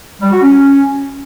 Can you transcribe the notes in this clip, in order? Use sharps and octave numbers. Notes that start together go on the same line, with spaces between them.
G3
F#4
C#4